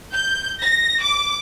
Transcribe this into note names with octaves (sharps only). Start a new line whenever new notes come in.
G6
A#6
D6